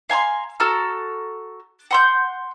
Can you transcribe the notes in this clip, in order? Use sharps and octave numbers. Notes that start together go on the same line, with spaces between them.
F5 G#5 A#5 C6
F#4 A4 A#5 F6
F#5 C6 G6